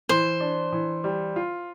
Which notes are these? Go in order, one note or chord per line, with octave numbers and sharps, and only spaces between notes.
E3 C5
D4
E3
G3
F4